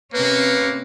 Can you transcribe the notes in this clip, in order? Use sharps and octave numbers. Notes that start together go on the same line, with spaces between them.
C3 A#3 C#4 B4